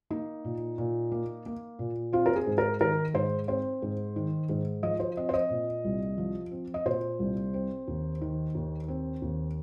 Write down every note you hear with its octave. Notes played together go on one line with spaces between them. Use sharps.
A#3 D#4
A#2
A#2
A#3
A#3
A#2
C4 F4
A#4
G#4
G#2
A#4
D#3 A#4
G#2 C5
C4 C5
G#2
D#3
G#2
F3 D#5
C5
C4 D#5
C5
D#5
A#2
C2
F3
C4
D#5
A#2 C5
C2
C4
D#2
D#3
D#2
C4
D#2